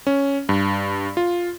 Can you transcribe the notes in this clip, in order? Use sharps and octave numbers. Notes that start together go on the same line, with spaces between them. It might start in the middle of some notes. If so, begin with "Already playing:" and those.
C#4
G2
F4